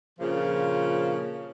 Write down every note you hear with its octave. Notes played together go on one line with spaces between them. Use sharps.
G2 A#2 C#3 F3